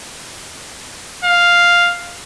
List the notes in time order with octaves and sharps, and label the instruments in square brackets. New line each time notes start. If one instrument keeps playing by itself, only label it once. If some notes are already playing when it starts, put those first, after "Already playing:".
[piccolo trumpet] F5